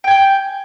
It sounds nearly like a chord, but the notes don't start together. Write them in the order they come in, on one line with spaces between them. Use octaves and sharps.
G5 G#5 G6